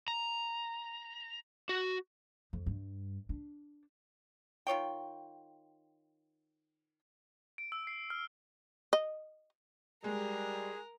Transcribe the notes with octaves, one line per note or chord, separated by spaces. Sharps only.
A#5
F#4
F2
G2
D4
D#3 F4 C#5 G5
D7
E6
C7
F6
D#5
G3 G#3 G#4 A#4